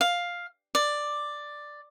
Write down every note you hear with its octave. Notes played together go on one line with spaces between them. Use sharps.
F5
D5